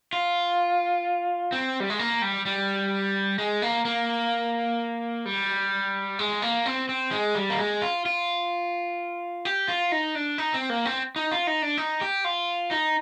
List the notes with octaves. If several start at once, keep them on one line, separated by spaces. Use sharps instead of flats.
F4
C4
G3
G#3
A#3
G3
G3
G#3
A#3
A#3
G3
G#3
A#3
C4
C4
G#3
G3
A#3
G#3
F4
F4
G4
F4
D#4
D4
D#4
C4
A#3
C4
D#4
F4
D#4
D4
D#4
G4
F4
D#4